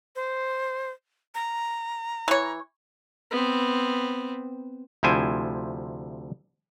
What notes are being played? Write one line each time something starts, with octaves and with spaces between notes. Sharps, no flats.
C5
A#5
E3 C#5
B3 C4
D2 C3 F3 E4 C5 G#5